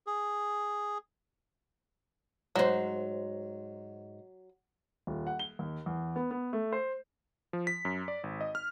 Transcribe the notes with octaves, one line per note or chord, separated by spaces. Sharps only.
G#4
G#2 F#3 C5
D#1
F#5
G7
D#2
E2
B3
B3
A3
C5
F3
B6
F#2
D5
G#1
D#5
F6